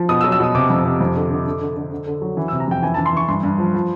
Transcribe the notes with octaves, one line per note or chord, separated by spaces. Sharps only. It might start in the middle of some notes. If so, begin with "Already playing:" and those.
Already playing: F3
B2 D#6
E6
F#3
E6
B2 D#6
C3 D6
F2
C3
F2
D3
D3
D3
D3
D3
D3
D3
F#3
E3
E6
C3
A#5
F2 G5
E3 G#5
A5
E3
C6
E3 C#6
G2 C6
G2
F3
F3